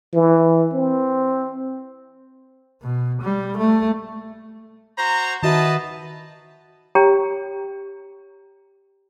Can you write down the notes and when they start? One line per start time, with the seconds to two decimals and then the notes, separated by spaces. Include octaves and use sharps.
0.14 E3
0.74 C4
2.82 B2
3.22 G3
3.58 A3
4.98 F#4 C5 A#5
5.43 D#3 F#4 B4 D#5 E5 A5
6.95 G4 C#5 G5 A#5